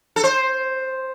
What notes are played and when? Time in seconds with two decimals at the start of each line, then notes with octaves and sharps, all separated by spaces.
0.16 A4
0.24 C5